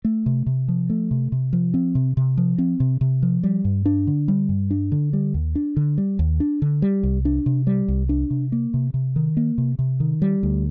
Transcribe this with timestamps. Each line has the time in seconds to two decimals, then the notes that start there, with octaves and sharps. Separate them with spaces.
0.05 A3
0.26 C3
0.46 C3
0.68 F3
0.90 A3
1.11 C3
1.32 C3
1.53 F3
1.74 C4
1.95 C3
2.17 C3
2.37 F3
2.58 C4
2.80 C3
3.01 C3
3.23 F3
3.43 G3
3.65 G2
3.86 D4
4.07 D3
4.28 G3
4.49 G2
4.71 D4
4.92 D3
5.13 G3
5.34 D#2
5.55 D4
5.77 D3
5.98 G3
6.19 D#2
6.40 D4
6.62 D3
6.82 G3
7.03 C2
7.25 D4
7.46 C3
7.67 G3
7.88 C2
8.09 D4
8.30 C3
8.52 A#3
8.74 C3
8.94 C3
9.16 D#3
9.37 A#3
9.58 C3
9.79 C3
10.00 D#3
10.22 G3
10.43 D2